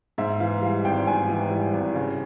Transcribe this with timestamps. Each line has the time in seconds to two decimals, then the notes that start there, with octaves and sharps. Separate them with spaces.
0.18 G#2 E5
0.40 E3 F5
0.62 G3 F5
0.85 G#1 G5
1.07 G#2 G#5
1.29 E3
1.51 G3
1.74 G#1
1.95 C#3